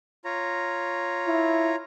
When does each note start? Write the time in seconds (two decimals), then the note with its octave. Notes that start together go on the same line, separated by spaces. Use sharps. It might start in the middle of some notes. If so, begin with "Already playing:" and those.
0.25 F4 C#5 A#5
1.27 E4